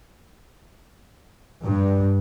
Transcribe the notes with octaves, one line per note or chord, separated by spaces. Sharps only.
G2